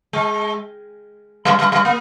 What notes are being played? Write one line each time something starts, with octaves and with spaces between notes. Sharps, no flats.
G#3
G3
G3
G3
A#3